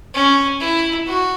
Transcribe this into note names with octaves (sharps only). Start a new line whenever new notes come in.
C#4
E4
F#4